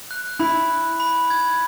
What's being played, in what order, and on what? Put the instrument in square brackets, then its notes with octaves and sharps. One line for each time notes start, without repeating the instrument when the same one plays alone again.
[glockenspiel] F#6
[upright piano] E4 [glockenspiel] B5
[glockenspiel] F#6
B5
G#6